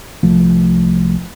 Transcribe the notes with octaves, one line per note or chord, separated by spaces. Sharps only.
C2 F3 A3